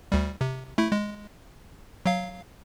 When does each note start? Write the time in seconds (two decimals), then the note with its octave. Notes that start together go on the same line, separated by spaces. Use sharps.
0.12 D2 G3
0.41 C3
0.78 A3 E4
0.92 G#3
2.06 F#3 F5